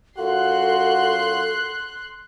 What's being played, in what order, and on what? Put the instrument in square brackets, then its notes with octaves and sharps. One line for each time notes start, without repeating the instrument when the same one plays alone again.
[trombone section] F#2 F4 F#4 [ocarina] A4 [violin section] C6 F#6